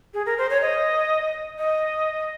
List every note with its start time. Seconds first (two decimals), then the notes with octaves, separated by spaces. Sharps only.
0.14 G#4
0.26 A#4
0.38 C5
0.50 C#5
0.61 D#5
1.58 D#5